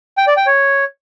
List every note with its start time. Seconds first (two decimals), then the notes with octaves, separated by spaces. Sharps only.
0.17 G5
0.27 D5
0.37 G5
0.47 C#5